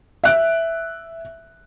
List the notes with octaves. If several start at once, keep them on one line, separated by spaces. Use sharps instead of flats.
E5 F#6 D7